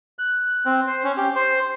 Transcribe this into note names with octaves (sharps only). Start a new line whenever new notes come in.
F#6
C4
C5
C#4
G4
C5